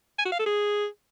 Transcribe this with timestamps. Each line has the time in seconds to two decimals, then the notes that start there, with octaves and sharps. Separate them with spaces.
0.18 G#5
0.25 F#4
0.32 F5
0.39 A4
0.46 G#4